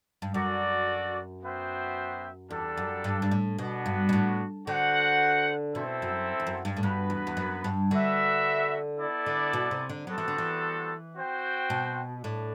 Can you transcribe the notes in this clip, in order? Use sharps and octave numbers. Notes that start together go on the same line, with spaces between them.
G2
F#2 F#4 A4 D5
B3 F#4 C5 E5 G5
E2 G3 D4 A4
F#2
G2
G2
A2
B2 B3 D4 F#4
G2
B2
A2
D3 F#4 C5 F#5
B2 C4 E4 A4 C5 E5
F#2
E2
F#2
G2
A2
G2 B3 F#4 B4
E2
E2
F#2
G2
D3 F#4 B4 E5
B3 E4 A4 D5
D3
B2
C3
D3
F#3 G3 B3 F#4 A4 C5
E3
D3
E3
C4 F#4 C5 G5
B2
A2 D4